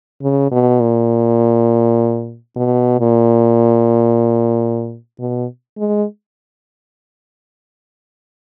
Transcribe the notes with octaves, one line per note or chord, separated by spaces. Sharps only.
C#3
B2
A#2
B2
A#2
B2
G#3